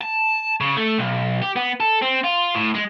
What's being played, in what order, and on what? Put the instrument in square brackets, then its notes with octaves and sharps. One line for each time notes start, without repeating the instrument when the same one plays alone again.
[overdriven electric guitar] A5
C#3
A3
B1
G4
B3
A4
C4
F4
A2
G#3